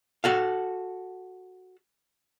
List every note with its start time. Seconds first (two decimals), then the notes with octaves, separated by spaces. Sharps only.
0.24 F#4 A4 F5